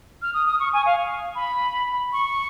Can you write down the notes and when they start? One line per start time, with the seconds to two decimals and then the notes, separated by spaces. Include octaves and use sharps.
0.22 F6
0.34 D#6
0.47 D#6
0.60 C#6
0.73 G#5
0.86 F5
1.36 B5
2.13 C#6